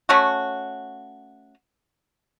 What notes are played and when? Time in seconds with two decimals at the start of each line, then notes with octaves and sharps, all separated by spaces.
0.09 A3 C#4 F#4